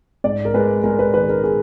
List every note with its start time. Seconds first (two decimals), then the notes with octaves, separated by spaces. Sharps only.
0.24 G#2 D5
0.45 A#4
0.54 G#3 B4
0.84 G#3 A#4
0.99 B4
1.14 D#3 B4
1.29 A#4
1.44 G#4